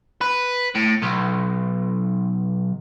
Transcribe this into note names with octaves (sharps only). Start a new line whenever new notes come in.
B4
A2
B1